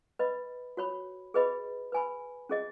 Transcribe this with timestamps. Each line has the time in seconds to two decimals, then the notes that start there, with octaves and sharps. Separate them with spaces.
0.19 B4 D#5 B5
0.77 F#4 C#5 B5
1.34 G#4 B4 D#5 B5
1.92 B4 G#5 B5
2.49 C#4 G#4 D#5